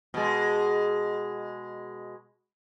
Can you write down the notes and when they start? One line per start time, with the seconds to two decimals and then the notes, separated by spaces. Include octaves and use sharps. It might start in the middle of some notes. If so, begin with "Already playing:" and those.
0.14 B2 G#3